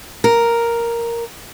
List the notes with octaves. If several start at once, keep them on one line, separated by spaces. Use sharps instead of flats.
A#4